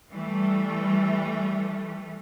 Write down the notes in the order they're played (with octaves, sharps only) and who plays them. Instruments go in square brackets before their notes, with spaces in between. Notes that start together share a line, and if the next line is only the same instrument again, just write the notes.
[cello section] E3 G3 A3